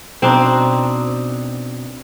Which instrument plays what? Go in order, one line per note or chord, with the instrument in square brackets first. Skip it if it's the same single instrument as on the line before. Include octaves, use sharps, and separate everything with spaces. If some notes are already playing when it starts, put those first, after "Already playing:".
[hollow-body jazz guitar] B2 [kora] C4 D4 D#4